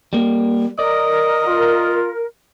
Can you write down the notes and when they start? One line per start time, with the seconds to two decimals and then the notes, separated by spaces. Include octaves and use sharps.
0.13 G3 A#3
0.79 A#4 D5 D#5
1.46 F4